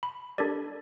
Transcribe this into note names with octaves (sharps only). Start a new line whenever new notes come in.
B5
D4 G4 A4 A#4 D5